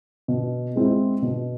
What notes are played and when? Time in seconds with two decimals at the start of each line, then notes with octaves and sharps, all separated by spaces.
0.28 B2
0.76 G#3 C4 E4
1.22 B2